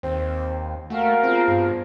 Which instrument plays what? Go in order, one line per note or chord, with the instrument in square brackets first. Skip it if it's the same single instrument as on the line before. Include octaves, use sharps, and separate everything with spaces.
[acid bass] D#2 [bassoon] C4
[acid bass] A3 [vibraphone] A#3 G#5 [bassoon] F#4 [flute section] A#4 F5
[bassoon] F3 [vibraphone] B3 F4 G#4 [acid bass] C4
[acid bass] G2